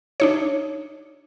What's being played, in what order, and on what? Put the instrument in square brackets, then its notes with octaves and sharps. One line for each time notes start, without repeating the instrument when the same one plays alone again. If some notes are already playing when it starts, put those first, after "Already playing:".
[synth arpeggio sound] D4 D#4 C#5